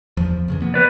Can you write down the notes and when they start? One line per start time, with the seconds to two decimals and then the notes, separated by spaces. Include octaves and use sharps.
0.17 E2 F3
0.48 F2 C#3 E3
0.62 F3 A#3 B3
0.74 B4 D5